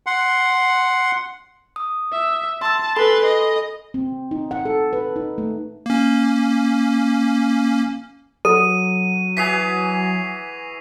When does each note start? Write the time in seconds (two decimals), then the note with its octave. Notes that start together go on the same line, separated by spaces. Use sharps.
0.06 F#5 C6
1.76 D#6
2.12 E5
2.62 A5 C6 E6
2.97 A4 B4 G#5 B5 C6
3.25 D#5
3.94 C4
4.31 D#4
4.51 F#5
4.65 A4
4.93 B4
5.16 D#4
5.38 A3
5.86 A#3 C#4
8.45 F#3 A4 D#7
9.37 E3 F#4 G#4 B6 C7 F7